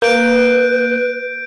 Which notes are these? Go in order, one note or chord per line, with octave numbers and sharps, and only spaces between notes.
A#3 B4 G6 D7